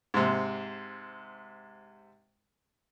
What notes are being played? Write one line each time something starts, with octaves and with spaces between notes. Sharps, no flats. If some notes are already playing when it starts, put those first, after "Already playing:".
G#2 C3